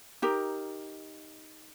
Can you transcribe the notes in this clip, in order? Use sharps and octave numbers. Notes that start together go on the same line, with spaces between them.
D#4 G4 A#4